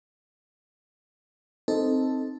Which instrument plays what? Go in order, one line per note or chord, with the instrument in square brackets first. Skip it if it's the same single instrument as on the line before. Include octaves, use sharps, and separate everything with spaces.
[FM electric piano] C4 D#4 A4